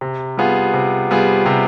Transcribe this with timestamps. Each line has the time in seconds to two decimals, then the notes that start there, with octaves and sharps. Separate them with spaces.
0.01 C3
0.37 G3 B3 F4 G#4
0.74 C3
1.11 G3 B3 F4 G#4
1.46 C3